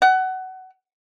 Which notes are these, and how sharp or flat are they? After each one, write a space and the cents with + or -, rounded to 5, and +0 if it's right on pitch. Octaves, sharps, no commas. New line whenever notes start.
F#5 +20